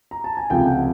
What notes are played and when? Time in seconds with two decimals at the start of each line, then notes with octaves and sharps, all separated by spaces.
0.11 A#5
0.24 A5
0.37 G#5
0.50 C#2 C3 F3 A3 G5
0.66 F#5